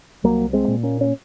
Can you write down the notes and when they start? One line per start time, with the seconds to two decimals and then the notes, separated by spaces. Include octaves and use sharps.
0.24 C2 F#3 A#3
0.53 G#3 C4
0.68 A#2
0.83 A#3 C#4
1.01 C#4